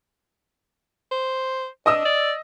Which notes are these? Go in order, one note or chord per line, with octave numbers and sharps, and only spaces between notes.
C5
D4 D#5 D#6 E6
D5